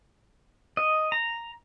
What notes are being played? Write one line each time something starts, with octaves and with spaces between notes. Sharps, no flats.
D#5
A#5